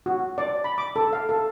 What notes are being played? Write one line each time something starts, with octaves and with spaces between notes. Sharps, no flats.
F#4
D5
B5
D6
A4
F5
A4